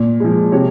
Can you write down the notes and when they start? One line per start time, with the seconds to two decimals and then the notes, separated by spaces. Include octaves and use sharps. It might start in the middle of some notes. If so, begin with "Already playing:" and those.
Already playing: A#2
0.20 F3 G#3
0.52 C3 C#5